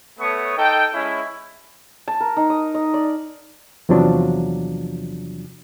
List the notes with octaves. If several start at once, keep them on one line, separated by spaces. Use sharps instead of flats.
A3 B3 C#5 C#6 D#6
D#4 A4 G5
G#3 C#4 E4
A5
A#4
D#4
D#6
D#5
D5
E2 C3 F3 F#3 D4